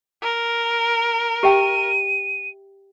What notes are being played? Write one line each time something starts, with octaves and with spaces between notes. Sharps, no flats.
A#4
G4 E5 G5 D#7